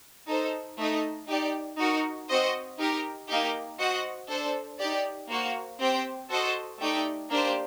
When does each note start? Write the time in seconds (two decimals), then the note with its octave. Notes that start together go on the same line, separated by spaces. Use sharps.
0.27 D#4 A4 C5
0.77 A3 D#4 A4 D#5
1.27 D#4 G4 D5
1.78 D#4 F#4 A#4
2.28 C4 F#4 C5 D#5
2.78 D#4 G4 A#4
3.28 A#3 D#4 G4
3.79 F#4 C5 D#5 F#5
4.29 D4 A4 C5
4.79 D#4 G4 D5
5.29 A#3 F#4 C5
5.79 C4 G4 C5 G5
6.30 F#4 A4 C5 D#5 A5
6.79 A3 D#4 G4 D5 G5
7.30 A#3 D4 G4 C5